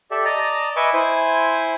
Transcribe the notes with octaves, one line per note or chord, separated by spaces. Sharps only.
G4 A4 D5 E5
D5 D#5 A5 A#5
B4 D#5 E5 G#5 C#6 D6
E4 C5 G#5